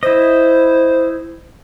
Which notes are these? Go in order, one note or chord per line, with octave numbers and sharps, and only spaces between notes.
E4 C5 D#5